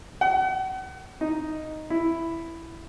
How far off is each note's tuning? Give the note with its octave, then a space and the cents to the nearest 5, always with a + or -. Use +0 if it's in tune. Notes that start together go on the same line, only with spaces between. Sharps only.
F#5 +40
D#4 +0
E4 +5